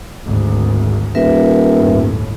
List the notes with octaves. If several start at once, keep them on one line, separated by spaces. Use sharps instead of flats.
G#1 D2
D#1 A#4 B4 E5
G1 D#2 A2